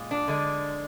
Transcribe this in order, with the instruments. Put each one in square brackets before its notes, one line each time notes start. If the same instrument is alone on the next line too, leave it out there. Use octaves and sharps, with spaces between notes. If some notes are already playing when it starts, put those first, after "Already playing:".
Already playing: [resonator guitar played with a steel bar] A#2 G#3
D4
D3 G#3